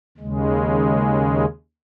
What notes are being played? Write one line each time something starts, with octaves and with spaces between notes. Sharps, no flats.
D#2 C#3 G#3